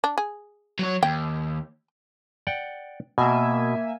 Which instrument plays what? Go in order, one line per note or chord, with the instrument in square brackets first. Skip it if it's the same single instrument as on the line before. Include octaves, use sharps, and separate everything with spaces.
[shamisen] D4
G#4
[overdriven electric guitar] F#3 C#5
[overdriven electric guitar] D#2 [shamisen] G5
[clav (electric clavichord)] D5 F#5 G5
[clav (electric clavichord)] B2 [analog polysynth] A#3 E5 G#5